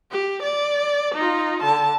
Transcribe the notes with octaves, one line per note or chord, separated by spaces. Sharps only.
G4
D5
D#4 F4
D3 A5